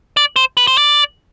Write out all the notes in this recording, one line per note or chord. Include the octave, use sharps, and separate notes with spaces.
D5
C5
B4
C5
D5